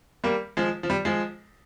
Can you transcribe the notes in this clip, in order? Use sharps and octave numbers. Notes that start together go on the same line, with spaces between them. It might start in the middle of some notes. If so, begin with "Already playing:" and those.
G3 A#3
F3 G#3
F3
G3
F3 G#3